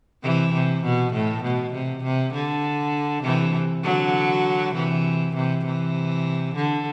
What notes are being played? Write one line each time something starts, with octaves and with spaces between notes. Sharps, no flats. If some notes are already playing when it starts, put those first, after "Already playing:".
C3 E3
C3
B2
A2
B2
C3
C3
D3
C3 E3
D3 F#3
C3 E3
C3 E3
C3 E3
D3